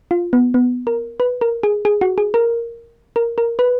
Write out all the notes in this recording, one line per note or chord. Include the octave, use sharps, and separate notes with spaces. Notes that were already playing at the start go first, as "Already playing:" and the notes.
F4
B3
B3
A#4
B4
A#4
G#4
G#4
F#4
G#4
A#4
A#4
A#4
B4